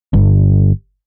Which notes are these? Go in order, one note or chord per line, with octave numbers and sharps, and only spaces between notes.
G1